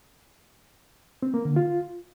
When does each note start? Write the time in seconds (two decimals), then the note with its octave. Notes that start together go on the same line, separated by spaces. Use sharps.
1.23 C4
1.34 A#3
1.45 D3
1.56 F4